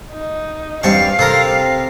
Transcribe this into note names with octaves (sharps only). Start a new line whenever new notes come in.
D#4
E2 G2 G3 C4 F5 A5 C#6
C3 A4 A#4